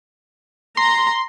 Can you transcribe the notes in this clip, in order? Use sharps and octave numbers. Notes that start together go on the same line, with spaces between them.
A#5 C6